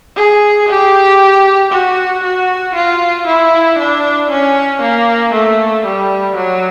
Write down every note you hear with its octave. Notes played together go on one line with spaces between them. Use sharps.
G#4
G4
F#4
F#4
F4
E4
D4
C#4
A#3
A3
G3
F#3